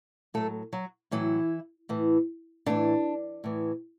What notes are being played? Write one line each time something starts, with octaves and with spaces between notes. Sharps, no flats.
A2 F#3 A3 A4
F#3 F#4
A2 E3 F#3 E4
A2 E3
A2 D3 E3 D4
A2 E3